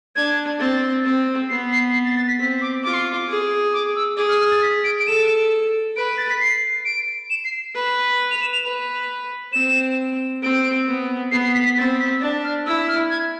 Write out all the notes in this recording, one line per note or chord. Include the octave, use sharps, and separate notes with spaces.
D4 G#6
C4 A6
C4
B3 C7
C7
C7
A6
A6
B6
C4 B6
D6
F4 D6
C6
D6
G#4
D6
E6
G#4 D6
F6
F6
A6
B6
D7
D7
A4 E7
B4 D7
A6
B6
C7
D7
E7
C7
B4
F7
E7
F7
B4
C4 E7
C4 D7
B3
B3 C7
C7
B6
B6
C4 A6
B6
D4 A6
F6
E4 E6
F6
G#6